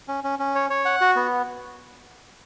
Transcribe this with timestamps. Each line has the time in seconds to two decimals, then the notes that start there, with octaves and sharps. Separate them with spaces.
0.08 C#4
0.24 C#4
0.39 C#4
0.55 C#5
0.70 C#5
0.85 F#5
1.01 F#4
1.16 B3